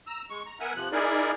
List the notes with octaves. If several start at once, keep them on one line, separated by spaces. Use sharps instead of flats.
A#5 E6
G#3 C#6
A#5
B3 A#4 E5 F#5 G#5
C3 F3 F#6
D#4 E4 G#4 A#4 D5